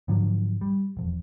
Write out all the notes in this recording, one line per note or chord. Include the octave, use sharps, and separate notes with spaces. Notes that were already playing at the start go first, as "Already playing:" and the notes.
G#2 D3 F3 F#3
G3
E1 F2